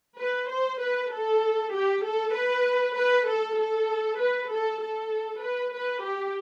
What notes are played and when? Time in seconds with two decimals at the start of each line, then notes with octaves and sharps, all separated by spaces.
0.19 B4
0.50 C5
0.80 B4
1.12 A4
1.73 G4
2.04 A4
2.34 B4
2.96 B4
3.27 A4
3.57 A4
4.19 B4
4.50 A4
4.81 A4
5.42 B4
5.73 B4
6.04 G4